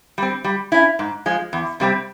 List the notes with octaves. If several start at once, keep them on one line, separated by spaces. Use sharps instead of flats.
G3 C4
G3
C#4 E4
G#2
F3 G#3
E2
C3 G3 C4